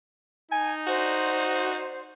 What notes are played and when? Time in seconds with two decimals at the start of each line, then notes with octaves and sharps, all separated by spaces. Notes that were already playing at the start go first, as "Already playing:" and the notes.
0.51 D#4 G#5
0.87 F#4 C5 D5